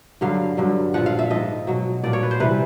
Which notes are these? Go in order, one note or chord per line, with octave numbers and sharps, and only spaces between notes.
G2 D3 F#3 F5
G2 D3 F#3
A#2 F3 F#5
F5
E5
G#2 F3 D#5
B2 F#3
A#2 F3 D5
C#5
B4
C5
C3 E3 G3 B4